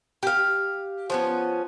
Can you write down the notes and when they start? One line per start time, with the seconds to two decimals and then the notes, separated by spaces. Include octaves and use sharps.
0.23 G4 F5
1.10 F3 B3 C#4